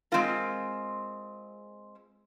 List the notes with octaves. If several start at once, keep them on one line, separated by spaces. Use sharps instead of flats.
G#3 C4 F4 A#4